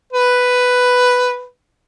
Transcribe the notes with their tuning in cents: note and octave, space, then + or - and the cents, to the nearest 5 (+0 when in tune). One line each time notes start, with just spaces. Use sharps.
B4 +5